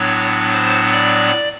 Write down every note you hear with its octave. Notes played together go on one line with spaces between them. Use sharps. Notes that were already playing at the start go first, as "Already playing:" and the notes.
Already playing: A2 F#3 B3 D4 C#5
C5
D5